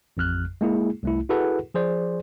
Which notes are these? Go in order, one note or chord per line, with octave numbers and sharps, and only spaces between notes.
A1 F2 F6 F#6
G#3 A#3 E4 G#4
C2 A3 E4
E4 F#4 G#4 A4 B4 F#5
F3 G#4 C5 D5